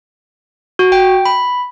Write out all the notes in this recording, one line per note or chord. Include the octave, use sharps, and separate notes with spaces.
F#4
G5
B5